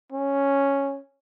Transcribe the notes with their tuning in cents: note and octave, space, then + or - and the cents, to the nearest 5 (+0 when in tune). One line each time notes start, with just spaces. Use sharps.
C#4 +0